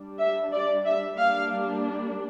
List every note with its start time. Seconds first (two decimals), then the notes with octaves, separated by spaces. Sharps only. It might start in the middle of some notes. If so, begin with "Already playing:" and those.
Already playing: G3 D4
0.19 E5
0.52 D5
0.85 E5
1.17 G3 A#3 D4 F5